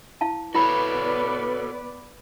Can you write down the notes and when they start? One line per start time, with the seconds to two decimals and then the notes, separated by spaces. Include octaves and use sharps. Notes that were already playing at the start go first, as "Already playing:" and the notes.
0.21 E4 F5 A5
0.55 B3 E4 F#4 A4 B4 C#5 D5 B5